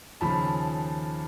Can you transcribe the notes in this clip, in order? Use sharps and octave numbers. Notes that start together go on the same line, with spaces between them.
D#2 C#3 F3 A5 B5